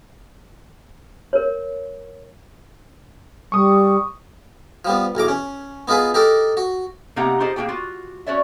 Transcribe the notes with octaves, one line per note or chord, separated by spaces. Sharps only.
A#4 C#5
G3 C#6 D#6
F3 G3 B3
B1 E2 A#5 D6
C#4
B3 D#4 F4 G#4 B4
D#4 G4 A4 A#4
F#4
C3 A#3 D#4 G4 F#5 A#5
D#4 F4 G4 G#4 C5 D#5
B2 A#3 E4 G4 G#4 G5
F4 F#4
C#4 F#4 C#5 D5 E5